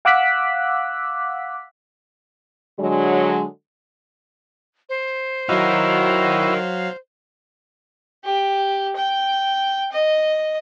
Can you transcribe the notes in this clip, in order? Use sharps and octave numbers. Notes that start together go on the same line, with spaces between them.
F5 F#5 D6 E6 F#6 B6
D3 F#3 G#3
C5
F#3 D#4 E4 F#4 A#4 F5
G4
G5
D#5